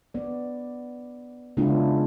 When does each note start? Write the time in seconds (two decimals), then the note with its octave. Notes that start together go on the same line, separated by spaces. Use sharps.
0.14 B3 D5
1.57 C#3 G#3 B3 D4 E4 F4